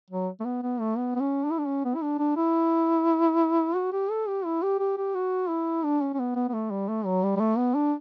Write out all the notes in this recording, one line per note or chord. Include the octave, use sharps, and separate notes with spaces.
F#3
A3
B3
B3
A3
B3
B3
C#4
D4
E4
D4
C#4
B3
E4
D4
D4
E4
F#4
G4
A4
G4
E4
G4
G4
G4
F#4
E4
D4
C#4
C#4
B3
B3
B3
A3
G3
A3
F#3
G3
G3
A3
B3
D4